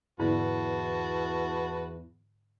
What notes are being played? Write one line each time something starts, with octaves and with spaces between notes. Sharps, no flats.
E2 G#2 D3 B3 E4 F#4 B4 A5